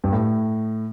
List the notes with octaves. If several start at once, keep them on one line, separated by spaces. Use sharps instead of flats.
G2
A2